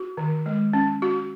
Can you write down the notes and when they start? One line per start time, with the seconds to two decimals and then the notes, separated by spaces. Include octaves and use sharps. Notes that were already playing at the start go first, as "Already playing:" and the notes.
Already playing: F#4
0.17 D#3
0.46 G#3
0.73 C#4
1.02 F#4